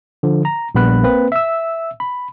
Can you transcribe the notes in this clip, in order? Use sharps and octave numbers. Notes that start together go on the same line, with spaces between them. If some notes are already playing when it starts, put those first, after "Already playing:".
D3 F3
A#5
A#1 G3 B3 B5 F#6
A#3 C4 B4
E5 E6
B5